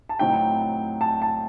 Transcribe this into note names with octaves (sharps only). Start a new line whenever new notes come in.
A5
A2 F#3 C4 D#4 G5
A5
A5